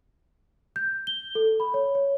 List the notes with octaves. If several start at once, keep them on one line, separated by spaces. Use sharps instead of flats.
G6
G7
A4
B5
C#5
C#5